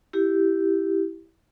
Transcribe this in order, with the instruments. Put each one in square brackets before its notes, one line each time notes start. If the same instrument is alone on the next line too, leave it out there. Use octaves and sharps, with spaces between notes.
[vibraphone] E4 G4